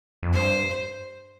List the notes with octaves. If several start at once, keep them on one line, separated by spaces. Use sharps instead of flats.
F2
G2 C5